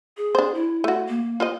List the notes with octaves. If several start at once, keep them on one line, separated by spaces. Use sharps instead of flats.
G#4
D4 C5
E4
A3 F#4
A#3
F4 C5 D#5